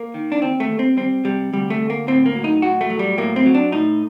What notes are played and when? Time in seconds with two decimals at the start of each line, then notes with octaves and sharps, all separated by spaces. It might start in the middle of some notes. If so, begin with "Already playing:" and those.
Already playing: A#3
0.14 D#3
0.32 D4
0.42 D#2 C4
0.60 A3
0.70 D#2
0.79 C4
0.97 G3 C4
1.25 C3 G3
1.53 D2 G3
1.70 A3
1.81 D2
1.90 A#3
2.07 A2 C4
2.26 A#3
2.35 F#3
2.44 D#4
2.62 A2 F#4
2.81 A3
2.90 F#3
2.99 G3
3.18 A2 A#3
3.36 C4
3.46 F#3
3.54 D4
3.72 A2 D#4